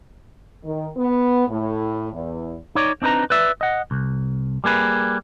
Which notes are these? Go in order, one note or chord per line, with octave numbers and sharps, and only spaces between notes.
D#3
B3
A2
E2
D#4 C#5 D5
C4 D4 D#4 B4 A#5
B4 D5 E5
D#5 F#5
C2
G3 A#3 G#4 B4